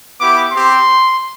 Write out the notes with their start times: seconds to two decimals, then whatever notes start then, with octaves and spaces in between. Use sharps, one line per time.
0.20 B3 E4 G4 D6
0.51 C4 G4 C6